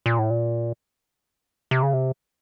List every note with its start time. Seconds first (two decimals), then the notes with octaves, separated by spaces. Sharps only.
0.06 A#2
0.19 A2
0.30 A#2
1.71 C3
1.82 C#3
1.93 C3